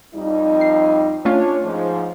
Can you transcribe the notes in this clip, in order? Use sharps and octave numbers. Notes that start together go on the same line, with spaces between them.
F2 G3 D#4
C7
A3 C#4 D4 F4 C#5
G#2 F3